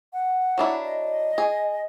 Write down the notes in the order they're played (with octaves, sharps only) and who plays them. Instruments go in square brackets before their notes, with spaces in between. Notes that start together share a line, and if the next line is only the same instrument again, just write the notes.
[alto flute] F#5
[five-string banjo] F#3 D4 E4
[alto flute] D#5
[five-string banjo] G#4